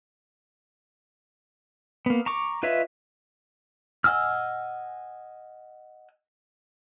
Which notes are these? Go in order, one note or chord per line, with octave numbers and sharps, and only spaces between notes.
A#3 B3
A#5 C#6 D6
F4 B4 C#5 D#5 E5
D#5 F#5 G#5 E6 F6